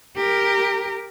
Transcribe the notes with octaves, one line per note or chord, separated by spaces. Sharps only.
G4 A#4